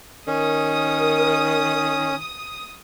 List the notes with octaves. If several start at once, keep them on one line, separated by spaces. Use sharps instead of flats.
D#3 C#4 A#4 D#6